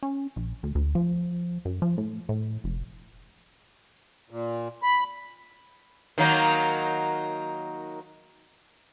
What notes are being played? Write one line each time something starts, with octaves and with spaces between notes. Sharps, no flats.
C#4
A#1
D2
D2
F3
F#2
F3
A2
A2
F1
A#2
B5
D#3 F#3 A#3